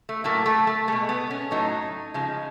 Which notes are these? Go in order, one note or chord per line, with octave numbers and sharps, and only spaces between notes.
A3
A2 F#3 A3 A#3
A3
A3
B2 G#3 A3
B3
C#4
A2 F#3 A3 D#4
C#3 F3 G#3